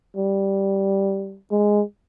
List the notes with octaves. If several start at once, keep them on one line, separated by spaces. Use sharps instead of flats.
G3
G#3